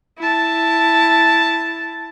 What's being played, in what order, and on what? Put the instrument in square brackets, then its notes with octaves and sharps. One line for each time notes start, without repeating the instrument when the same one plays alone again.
[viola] E4 A5